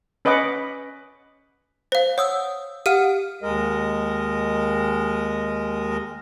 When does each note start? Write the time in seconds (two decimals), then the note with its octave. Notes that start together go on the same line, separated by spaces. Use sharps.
0.25 C#4 B4 D#5 F#5 D6
1.92 C5 F5
2.18 C#5 F#5 D#6 E6
2.86 G4 F5 F#5 F6 D#7
3.42 D#2 G#3 A#4 D#5